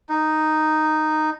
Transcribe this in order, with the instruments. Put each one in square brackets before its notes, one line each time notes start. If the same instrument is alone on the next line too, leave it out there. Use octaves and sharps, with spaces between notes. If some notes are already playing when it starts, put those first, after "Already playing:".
[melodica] D#4